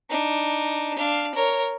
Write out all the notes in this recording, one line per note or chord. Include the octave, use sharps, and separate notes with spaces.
D4 D#4
D4 F5
A#4 C#5